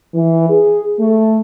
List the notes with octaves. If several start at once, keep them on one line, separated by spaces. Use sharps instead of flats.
E3
G#4
A3